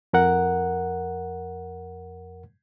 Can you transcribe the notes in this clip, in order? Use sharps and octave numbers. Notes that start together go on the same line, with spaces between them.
F2 A#4 F#5